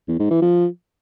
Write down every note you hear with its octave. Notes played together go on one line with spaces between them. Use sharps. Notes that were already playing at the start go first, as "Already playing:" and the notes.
E2
G#2
E3
F3